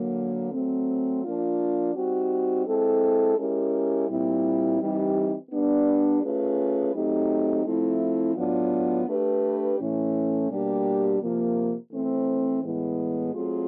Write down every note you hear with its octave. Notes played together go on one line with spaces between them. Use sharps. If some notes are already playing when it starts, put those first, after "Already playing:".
Already playing: D3 F#3 A#3
F#3 A3 C4
F3 A#3 D4 F4
G3 C4 D#4 F#4
G#3 C4 E4 A4
G#3 C#4 E4 G4 A#4
A#2 G3 C4 E4
E3 G3 C4 D#4 G4
G3 B3 D4
A3 C#4 F4 G#4 B4
F#3 A3 C4 D#4 G4
F3 A3 C4 E4
A2 F#3 B3 D4 F4
A3 D4 G4 B4
A2 E3 A3 C#4
B2 G3 A#3 D4 G4
C3 F3 A#3
E3 A3 C4
A2 E3 G#3 B3
F#3 A3 C4 F4 G#4